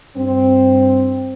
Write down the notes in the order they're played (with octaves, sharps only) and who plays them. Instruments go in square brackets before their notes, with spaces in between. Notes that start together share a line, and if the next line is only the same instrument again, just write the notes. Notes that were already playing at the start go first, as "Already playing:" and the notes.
[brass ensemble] G2 C4